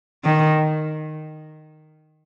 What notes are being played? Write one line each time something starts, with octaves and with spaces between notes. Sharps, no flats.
D#3